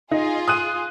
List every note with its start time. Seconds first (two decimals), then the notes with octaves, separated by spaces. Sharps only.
0.11 D#4 F4 G#4
0.48 D#6 F#6 D#7